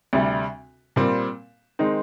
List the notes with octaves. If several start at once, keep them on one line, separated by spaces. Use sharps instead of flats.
D2 C3 G3
A#2 G3 C4
D#3 G#3 C4 D#4